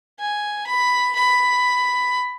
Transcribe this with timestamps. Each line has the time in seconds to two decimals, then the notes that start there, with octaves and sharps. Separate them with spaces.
0.20 G#5
0.67 B5
1.16 B5